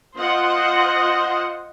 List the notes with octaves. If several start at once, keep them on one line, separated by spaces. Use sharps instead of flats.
F4 C5 D#5 F#5